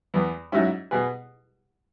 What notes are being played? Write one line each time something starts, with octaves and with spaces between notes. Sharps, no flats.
E2 E3 B3
G#2 F#3 C#4 E4
B2 B3 G#4 B4